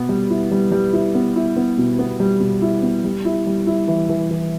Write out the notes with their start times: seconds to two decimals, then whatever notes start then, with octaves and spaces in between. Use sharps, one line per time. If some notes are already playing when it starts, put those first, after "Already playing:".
Already playing: B2 B3
0.09 G3
0.30 E4
0.51 G3
0.72 G3
0.93 E4
1.15 B3
1.36 E4
1.57 B3
1.78 B2
1.99 B3
2.20 G3
2.40 B2
2.62 E4
2.83 B3
3.04 G3
3.25 E4
3.47 G3
3.67 E4
3.88 E3
4.09 E3
4.31 E3